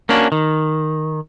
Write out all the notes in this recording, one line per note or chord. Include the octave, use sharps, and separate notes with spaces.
A#3 C#4 D4 F#4
D#3